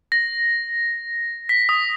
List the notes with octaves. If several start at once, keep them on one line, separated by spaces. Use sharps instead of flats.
A#6
B6
D#6